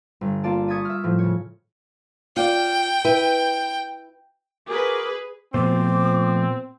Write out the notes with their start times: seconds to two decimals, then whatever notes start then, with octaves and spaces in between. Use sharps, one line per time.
0.21 G1
0.43 A#3 F4 D5 A5
0.68 C#6 D#6 G#6 A6 B6 D#7
0.85 E5 F6
1.04 A2 F3
1.19 C#3 C#5
2.36 F4 D5 G5
3.05 E4 B4
4.68 F#4 G#4 A#4 B4 D6
5.54 A#2 F3 A3 B3 C4 C5 D6